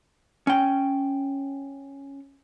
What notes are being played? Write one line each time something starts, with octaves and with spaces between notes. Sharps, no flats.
C#4 G5